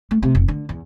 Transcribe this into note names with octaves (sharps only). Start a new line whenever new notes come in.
A3
C3
F1
D3
E2